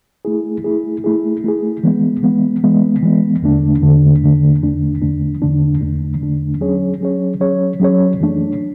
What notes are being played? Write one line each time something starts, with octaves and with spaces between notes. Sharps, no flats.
A3 E4 G#4
A3 E4 G#4
A3 E4 G#4
A3 E4 G#4
E3 G#3 B3
E3 G#3 B3
E3 G#3 B3
E3 G#3 B3
E2 D3 A3 D4
E2 D3 A3 D4
E2 D3 A3 D4
E2 D3 A3 D4
E2 D3 A3 D4
E2 D3 A3 D4
E2 D3 A3 D4
E2 D3 A3 D4
F#3 C#4 G#4 C#5
F#3 C#4 G#4 C#5
F#3 C#4 G#4 C#5
F#3 C#4 G#4 C#5
F#2 E3 A3 D4